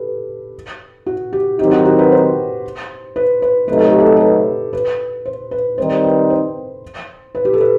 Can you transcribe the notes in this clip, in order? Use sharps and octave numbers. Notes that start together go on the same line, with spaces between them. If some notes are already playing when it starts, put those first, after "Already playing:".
Already playing: G4 A4 B4
F#4
G4
D#3 F#3 C4 D#4 G4
F#4
F#4
B4
C5
B4
B4
C3 F#3 A3 D#4 B4
A4
G4
A4
A4
B4
B4
C5
B4
D#3 G3 C4 D#4 C5
B4
C5
B4
G4
A4
B4